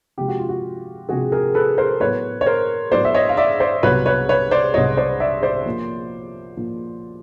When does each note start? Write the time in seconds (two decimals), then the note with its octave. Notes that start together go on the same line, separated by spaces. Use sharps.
0.18 C3 F3 G#3 G4
0.28 F#4
0.39 F4
0.49 F#4
1.09 C3 F3 G#3 F#4 G#4
1.32 G#4 A#4
1.54 A4 B4
1.78 A#4 C5
2.00 A2 F#3 B3 B4 C#5
2.41 C#5
2.46 A#4 C5
2.91 A2 F#3 B3 C5 D5
3.05 E5
3.14 C#5 D#5
3.29 F5
3.37 D5 E5
3.60 C5 D5
3.83 C2 B2 F#3 B4 C#5
4.06 B4 C#5
4.29 B4 C#5
4.51 C5 D5
4.74 C2 B2 F#3 C#5 D#5
4.97 C5 D5
5.20 D5 E5
5.43 C5 D5
5.66 A#2 F3 A#3
6.57 A#2 F3 A#3